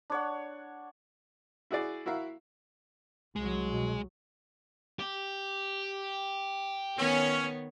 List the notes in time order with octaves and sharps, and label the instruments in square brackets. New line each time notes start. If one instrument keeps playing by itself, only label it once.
[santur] D4 C#5 F#5
[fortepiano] E4 F#4 G#4 D5
E4 F#4 A#4 E5 F5
[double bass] C2 F#3 [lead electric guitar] G#3
[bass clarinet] B2
[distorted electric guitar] G4
[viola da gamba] D#3 B3 C#5 [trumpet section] C#4